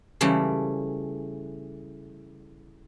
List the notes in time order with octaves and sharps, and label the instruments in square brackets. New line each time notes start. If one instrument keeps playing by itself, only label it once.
[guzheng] C#3 E3 G3 A3